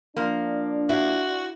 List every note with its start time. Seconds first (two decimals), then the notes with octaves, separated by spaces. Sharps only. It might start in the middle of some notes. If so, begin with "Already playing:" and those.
0.16 F3 A#3 D4
0.89 E4 F#4 F5